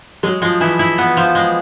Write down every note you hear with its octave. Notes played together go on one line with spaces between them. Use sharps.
F#3 G#3
F3 G#3
E3 E4
E4
B3
F3
G#3